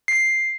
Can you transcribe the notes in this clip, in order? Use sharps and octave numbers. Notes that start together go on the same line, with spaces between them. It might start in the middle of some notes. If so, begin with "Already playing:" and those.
C7